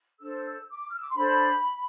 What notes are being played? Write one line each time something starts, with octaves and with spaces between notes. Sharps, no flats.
D4 A4 C5 E6
E6
D6
F6
E6
D6
C6
D4 A4 C5 B5